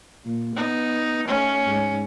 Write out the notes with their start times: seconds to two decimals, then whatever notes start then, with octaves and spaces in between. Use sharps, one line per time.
0.25 A#2
0.56 B3 D#4
1.28 A3 C#4
1.68 G#2